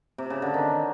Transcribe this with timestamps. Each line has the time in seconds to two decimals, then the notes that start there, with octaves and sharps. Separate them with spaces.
0.18 C3
0.30 C#3
0.42 D3
0.54 D#3